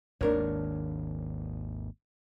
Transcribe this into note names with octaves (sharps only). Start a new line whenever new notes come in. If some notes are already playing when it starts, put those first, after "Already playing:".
G#1 D#2 D4 A#4 C#5